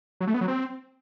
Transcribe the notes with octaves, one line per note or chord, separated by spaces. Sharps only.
F#3
A3
B3
F#3
C4